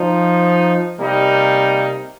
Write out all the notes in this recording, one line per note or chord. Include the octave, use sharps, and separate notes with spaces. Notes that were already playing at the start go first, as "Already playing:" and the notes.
Already playing: F3 D#4
C3 G3 A#3 D#4